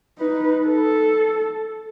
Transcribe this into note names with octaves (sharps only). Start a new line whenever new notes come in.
D#4 B4
A4